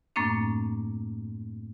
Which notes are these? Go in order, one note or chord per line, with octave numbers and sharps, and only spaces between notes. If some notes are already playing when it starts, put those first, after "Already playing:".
F#2 A2 A3 A#3 C4 D4